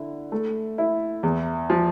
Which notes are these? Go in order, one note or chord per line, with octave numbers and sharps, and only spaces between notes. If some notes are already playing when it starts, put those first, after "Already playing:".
Already playing: D3 E4
A3
E4
E2
F3